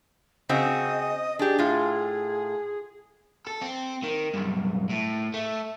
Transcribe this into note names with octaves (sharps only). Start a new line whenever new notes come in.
C#3 C4 F#4 D#5
D4 G4 G#4
A2 F4
A4
C4
D#3
B1 G2
A2
A3